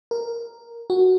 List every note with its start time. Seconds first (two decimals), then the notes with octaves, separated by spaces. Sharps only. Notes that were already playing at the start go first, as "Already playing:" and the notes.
0.11 A#4
0.90 F#4